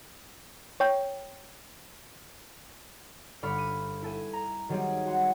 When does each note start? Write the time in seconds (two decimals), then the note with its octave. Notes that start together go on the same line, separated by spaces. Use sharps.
0.80 C#5 G5
3.42 G1 D4 B4 B5 C#6 F6
3.58 D#7
4.02 E4 A4 G#5
4.33 A#5
4.69 D#3 F#3 G3 C4 G#4
5.05 F#4 F#5 C6